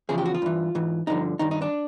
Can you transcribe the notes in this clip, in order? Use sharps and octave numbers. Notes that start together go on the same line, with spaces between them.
E2 C#3 F3 G#4
G4
F#4
F4
G2 E3
G#2 E3
G2 D3 F3 D#4
G2 D#3 D#4
D#4
D4